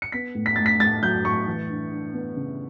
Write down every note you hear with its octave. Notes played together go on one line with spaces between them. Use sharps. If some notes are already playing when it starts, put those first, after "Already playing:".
C#7
B3 B6
A2
B6
A2 A6
B6
A2 A6
F#3 G6
A2 C#6
E3
D4
D4
B3
C#3